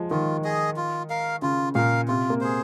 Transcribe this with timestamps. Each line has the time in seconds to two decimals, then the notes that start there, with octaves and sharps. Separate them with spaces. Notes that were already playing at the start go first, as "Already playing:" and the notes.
Already playing: F3 G#3
0.11 D#3 F4
0.44 G#4 D#5
0.76 F4
1.10 A#4 F5
1.42 C#3 F4
1.75 A#2 A#4 F5
2.08 C3 F4
2.30 A#3
2.41 G#4 C5